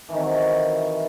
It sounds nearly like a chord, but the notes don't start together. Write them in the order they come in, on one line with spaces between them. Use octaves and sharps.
E3 D#3 C3 F#3